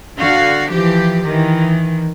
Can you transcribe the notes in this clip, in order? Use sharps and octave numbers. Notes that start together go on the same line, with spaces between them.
D3 F#4 F5
E3 F3 G4
D#3 E3